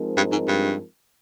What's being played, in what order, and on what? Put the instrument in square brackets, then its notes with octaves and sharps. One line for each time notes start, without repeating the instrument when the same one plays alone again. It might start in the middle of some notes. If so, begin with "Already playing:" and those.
Already playing: [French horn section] F3 G#3 C4 D#4 A#4
[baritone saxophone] G2
G#2
G2